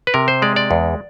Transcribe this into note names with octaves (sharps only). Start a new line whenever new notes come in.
B4
C3 A#4
C5
G#3 D5
D5
E2